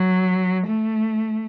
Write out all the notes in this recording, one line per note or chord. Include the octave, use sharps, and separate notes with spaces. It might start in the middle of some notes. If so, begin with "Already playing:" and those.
Already playing: F#3
A3